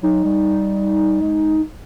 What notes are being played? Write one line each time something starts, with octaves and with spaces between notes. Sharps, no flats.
F#3 D#4
G3
G#3